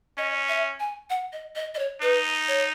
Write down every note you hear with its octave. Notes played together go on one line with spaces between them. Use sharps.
C#4 D#5
E5
G#5
F#5
D#5
D#5
D#5
C#5
D#4 B4
C#5